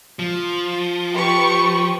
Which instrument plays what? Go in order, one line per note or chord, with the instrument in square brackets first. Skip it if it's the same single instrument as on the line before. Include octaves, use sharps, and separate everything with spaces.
[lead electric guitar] F3
[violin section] G4 B4 C#6